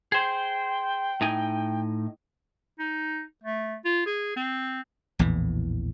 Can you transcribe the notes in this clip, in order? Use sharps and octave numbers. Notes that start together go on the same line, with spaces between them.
G#4 C5 G5
A2 D#4 G#5
D#4
A3
F4
G#4
C4
A#1 E2 A2 E3